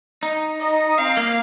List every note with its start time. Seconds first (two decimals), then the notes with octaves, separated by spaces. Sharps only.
0.23 D#4
0.61 D#5
0.98 C4 F5
1.17 A#3